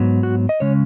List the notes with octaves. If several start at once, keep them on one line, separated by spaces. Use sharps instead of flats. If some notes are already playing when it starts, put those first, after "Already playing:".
Already playing: G#2 F#3 B3
F#4
D#5
C#3 G#3 C#4 C#5